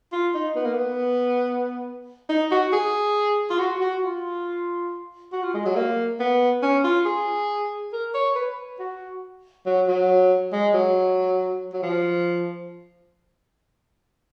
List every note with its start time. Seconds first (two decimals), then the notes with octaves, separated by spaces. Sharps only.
0.12 F4
0.34 D#4
0.56 B3
0.65 A#3
0.74 B3
2.29 D#4
2.51 F#4
2.73 G#4
3.50 F4
3.59 F#4
3.81 F#4
4.02 F4
5.32 F#4
5.43 F4
5.54 G#3
5.66 F#3
5.76 A#3
6.20 B3
6.62 C#4
6.84 F4
7.06 G#4
7.93 A#4
8.14 C#5
8.35 B4
8.79 F#4
9.66 F#3
9.88 F#3
10.52 G#3
10.74 F#3
11.73 F#3
11.83 F3